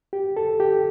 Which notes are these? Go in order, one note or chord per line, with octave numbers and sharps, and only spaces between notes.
G4
A4
G4